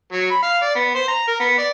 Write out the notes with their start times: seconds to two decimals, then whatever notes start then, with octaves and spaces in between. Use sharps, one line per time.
0.12 F#3
0.31 B5
0.43 F5
0.62 D5
0.76 B3
0.95 C5
1.08 A#5
1.28 A#4
1.40 B3
1.58 D5